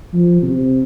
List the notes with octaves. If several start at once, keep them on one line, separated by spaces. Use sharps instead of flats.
F3
C3